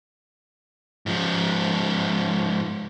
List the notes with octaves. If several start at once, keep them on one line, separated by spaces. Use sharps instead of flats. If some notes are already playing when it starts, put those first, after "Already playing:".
G#2 F3